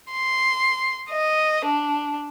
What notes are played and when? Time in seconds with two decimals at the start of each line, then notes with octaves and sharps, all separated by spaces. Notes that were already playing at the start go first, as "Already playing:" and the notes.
0.11 C6
1.10 D#5
1.65 D4